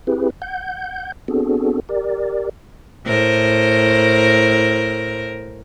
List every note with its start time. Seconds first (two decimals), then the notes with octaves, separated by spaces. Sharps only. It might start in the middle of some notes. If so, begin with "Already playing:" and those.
0.07 C4 E4 G4 G#4 B4
0.42 F#5 G6
1.28 B3 C4 D4 F#4 G#4 A4
1.89 G4 A#4 D5
3.05 A2 A#4 C5